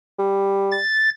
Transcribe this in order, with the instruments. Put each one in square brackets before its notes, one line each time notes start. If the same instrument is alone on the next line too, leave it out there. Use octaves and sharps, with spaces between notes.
[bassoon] G3
[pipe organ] A6